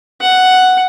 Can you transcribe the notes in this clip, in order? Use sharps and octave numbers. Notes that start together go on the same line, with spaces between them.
F#5